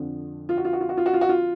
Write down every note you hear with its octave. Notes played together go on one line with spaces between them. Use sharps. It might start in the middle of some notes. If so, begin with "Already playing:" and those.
Already playing: F2 D3 F3
F4
F#4
F4
F#4
F4
F#4
F4
F#4
F4
F#4
F4